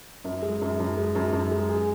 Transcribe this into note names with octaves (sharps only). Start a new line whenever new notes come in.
F#2
G#3
F#2
F#2
G#3
F#2
F#2
G#3
G#4